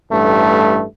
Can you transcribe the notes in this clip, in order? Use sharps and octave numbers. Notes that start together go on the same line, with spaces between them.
A1 G2 A3